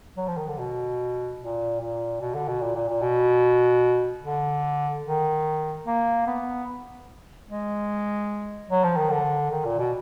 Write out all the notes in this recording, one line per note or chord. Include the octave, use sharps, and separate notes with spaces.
F#3
F3
D#3
D3
B2
A#2
A#2
B2
D3
B2
A#2
A#2
A#2
B2
D3
D#3
A#3
B3
G#3
F#3
F3
D#3
D3
D#3
A#2
B2